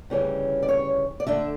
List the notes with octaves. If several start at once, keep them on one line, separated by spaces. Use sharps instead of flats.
D2 C#3 E3 G3 C#4
D5
C#5
D5
D3 A3 D4 E5